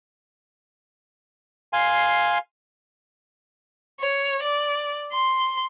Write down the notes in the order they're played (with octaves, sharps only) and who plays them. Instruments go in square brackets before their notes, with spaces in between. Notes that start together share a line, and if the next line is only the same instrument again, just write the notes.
[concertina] F5 G#5 C6
[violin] C#5
D5
C6